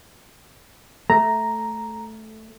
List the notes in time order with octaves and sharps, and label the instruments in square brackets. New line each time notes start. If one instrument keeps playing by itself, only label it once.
[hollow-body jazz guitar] A3 [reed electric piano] A#5